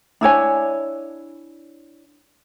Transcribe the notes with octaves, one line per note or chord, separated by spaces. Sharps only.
D4 E4 C#5 G#5